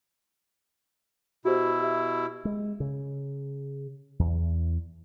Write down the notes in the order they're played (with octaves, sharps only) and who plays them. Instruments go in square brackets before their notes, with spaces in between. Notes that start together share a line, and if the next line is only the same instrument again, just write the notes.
[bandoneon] B2 E4 [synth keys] F#4 G4 C5
[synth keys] G4 E5
[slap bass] G#3
C#3
E2